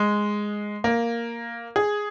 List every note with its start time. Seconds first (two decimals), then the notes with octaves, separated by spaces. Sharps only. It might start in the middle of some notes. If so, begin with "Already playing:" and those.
Already playing: G#3
0.84 A#3
1.76 G#4